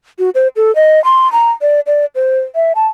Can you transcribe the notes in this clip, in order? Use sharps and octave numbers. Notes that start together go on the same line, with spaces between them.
F#4
C5
A4
D#5
C6
A#5
D5
D5
C5
E5
A5